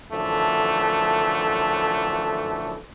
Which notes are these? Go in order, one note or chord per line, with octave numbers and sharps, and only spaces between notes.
F#2 D3 E3 F3 A3